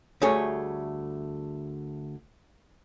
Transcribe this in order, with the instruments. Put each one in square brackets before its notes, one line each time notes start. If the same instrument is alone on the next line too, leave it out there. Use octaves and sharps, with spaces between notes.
[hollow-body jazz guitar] D2 G3 A3 G#4 C#5